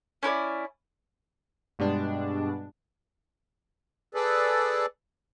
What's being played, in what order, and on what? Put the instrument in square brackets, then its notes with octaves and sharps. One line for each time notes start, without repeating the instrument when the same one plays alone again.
[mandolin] C#4 E4 B4 D5
[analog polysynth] G2 B2 G3 G#3 D4
[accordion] G#4 A4 B4 D5